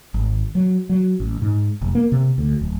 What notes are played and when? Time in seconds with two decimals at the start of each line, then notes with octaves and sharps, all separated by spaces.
0.14 G#1
0.55 F#3
0.89 F#3
1.20 A1
1.42 G#2
1.82 F1
1.95 A#3
2.12 C3
2.38 D2
2.61 D1